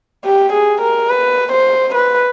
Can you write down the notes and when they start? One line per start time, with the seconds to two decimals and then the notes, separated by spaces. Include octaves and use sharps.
0.25 G4
0.53 G#4
0.81 A#4
1.09 B4
1.52 C5
1.94 B4